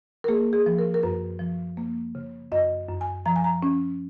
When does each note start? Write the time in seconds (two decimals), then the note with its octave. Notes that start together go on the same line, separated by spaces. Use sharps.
0.24 A#4
0.28 A#3 G#4
0.53 G#4
0.66 F3
0.79 A#4
0.94 A#4
1.03 F#2 B4
1.39 F3
1.77 A#3
2.15 C#3
2.52 F#2 D#5
2.88 F#2
3.01 G#5
3.26 F3 A#5
3.36 G#5
3.44 A#5
3.63 C#4